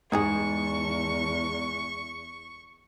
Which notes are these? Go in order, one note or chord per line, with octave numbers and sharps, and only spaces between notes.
E2 G#2 B3 D#4 G#4 C#6